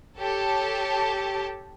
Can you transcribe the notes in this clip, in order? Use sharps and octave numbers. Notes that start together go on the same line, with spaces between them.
G4 A4 C#5 A5